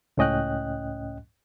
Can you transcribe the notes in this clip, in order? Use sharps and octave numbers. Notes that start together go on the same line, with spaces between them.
C#2 A2 C#4 D#5 G5 F#6